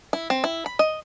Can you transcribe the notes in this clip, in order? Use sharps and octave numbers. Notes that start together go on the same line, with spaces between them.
E4
C4
E4
B5
D#5